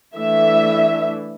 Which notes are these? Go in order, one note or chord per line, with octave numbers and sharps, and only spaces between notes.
E3 A3 D4 E5